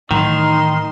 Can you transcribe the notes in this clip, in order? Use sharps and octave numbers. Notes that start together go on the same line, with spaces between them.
A2 D#3 E3 F#3 D#4 C6